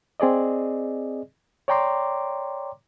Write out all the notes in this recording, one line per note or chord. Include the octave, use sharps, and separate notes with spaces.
C4 G#4 D5 D#5
C#5 D5 G5 A#5 C6 D6